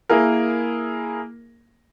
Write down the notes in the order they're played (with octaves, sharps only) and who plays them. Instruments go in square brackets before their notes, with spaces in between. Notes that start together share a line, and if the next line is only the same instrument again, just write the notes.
[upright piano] A#3 E4 G#4 A#4